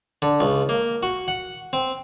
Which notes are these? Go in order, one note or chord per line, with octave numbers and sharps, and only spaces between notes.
D3
C#2
A#3
F#4
F#5
C4